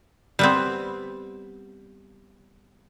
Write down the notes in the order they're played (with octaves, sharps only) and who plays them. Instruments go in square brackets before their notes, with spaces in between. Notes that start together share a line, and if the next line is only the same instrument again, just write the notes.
[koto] G3 B3 C4